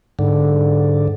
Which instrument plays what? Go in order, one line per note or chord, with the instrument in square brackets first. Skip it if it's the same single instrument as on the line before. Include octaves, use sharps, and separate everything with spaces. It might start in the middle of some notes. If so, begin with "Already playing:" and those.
[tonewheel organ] G#2 D3